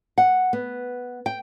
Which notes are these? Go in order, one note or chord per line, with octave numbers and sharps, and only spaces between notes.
F#5
B3
G5